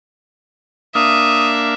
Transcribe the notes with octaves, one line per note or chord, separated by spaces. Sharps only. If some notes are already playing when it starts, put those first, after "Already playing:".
A#3 D4 E5 F5 D#6